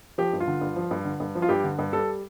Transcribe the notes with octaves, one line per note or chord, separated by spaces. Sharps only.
F3 G4
G2
F4
D3
G2
F3
G2
D3
G2
F3
F4
G2 G4
D3
G2
G3 A4